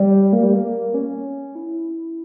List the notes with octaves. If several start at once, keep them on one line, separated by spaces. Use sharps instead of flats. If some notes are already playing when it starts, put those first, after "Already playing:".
Already playing: G3
A#3
G3
A#3
C#4
E4